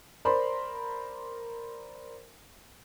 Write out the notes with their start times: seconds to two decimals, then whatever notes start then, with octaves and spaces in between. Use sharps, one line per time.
0.25 A#4 C5 D5 B5 C6